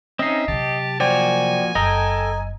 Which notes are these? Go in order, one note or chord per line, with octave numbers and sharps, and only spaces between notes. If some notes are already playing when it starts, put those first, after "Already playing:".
C4 C#4 D#4 D#5 E5 C7
C3 F#3 G4 A5
F3 A#3 F#4 C5 D5 G5 G#5
F#1 A4 D#5 G5 A#5